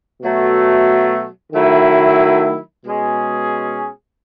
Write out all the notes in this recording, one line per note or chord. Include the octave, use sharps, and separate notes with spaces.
B2 F#3 A3
D#3 F#3 A3 E4
B2 G#3 C#4 G#4